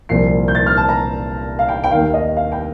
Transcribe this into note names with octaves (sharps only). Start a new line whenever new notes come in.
C2 A#2 F3 C7
G6
A6
F6
A5
A#5
F5
G5
G5
D#2 D#3 F5
D#5
F5
G5